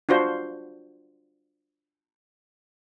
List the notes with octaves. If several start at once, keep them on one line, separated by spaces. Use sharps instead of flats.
D4 F4 F#4 C5